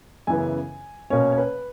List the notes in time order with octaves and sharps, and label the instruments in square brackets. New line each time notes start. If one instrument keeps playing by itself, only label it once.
[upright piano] F#2 C#3 E3 B3 G#5
B2 A#3 C#4 C#5
C#5
B4